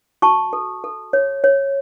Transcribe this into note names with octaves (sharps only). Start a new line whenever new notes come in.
F#4 A5 C#6
A4
A4
C#5
C#5